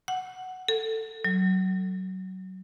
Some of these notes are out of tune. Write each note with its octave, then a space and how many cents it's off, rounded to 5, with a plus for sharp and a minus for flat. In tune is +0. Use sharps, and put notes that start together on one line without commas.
F#5 +5
A4 +15
F#3 +20